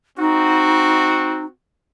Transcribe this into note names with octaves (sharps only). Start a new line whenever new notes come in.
C4 D#4 F#4